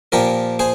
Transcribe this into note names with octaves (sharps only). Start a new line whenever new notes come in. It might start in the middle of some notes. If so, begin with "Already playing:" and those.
A#2 F3 G4 A#4
G#4 C5